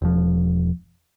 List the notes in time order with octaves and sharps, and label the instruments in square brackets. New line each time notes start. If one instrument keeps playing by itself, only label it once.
[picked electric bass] E1 F3